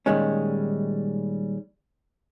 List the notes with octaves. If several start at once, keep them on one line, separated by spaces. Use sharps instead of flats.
A#2 D#3 G3 G#3 C#4